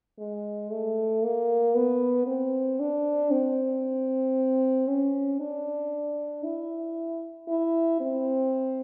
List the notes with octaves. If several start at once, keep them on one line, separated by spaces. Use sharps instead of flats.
G#3
A3
A#3
B3
C4
D4
C4
C#4
D4
E4
E4
C4